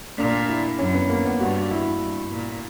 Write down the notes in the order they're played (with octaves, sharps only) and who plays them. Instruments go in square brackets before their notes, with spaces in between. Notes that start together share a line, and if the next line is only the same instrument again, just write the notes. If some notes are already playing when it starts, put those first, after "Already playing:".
[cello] A#2 [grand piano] D4
[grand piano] E4
[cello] F#2 [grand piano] C#4
[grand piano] B3
A#3
B3
[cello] G2 [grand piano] F#4
[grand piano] E4
[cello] G2
A#2